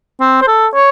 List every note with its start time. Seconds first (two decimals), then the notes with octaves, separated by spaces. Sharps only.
0.20 C4
0.41 C5
0.48 A4
0.74 C#5